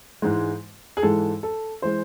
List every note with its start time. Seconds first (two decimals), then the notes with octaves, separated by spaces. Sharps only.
0.22 G#2 E3 G#3
0.97 G#4
1.03 G#2 E3 G#3 A4
1.43 A4
1.82 E3 G#3 C5